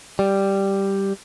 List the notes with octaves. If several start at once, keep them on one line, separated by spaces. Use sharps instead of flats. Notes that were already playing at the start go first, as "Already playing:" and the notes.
G3